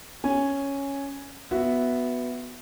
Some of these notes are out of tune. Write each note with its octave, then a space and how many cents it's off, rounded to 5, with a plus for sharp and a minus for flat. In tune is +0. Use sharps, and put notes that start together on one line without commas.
C#4 +0 G#5 +0
B3 +0 F#4 +0 E5 +5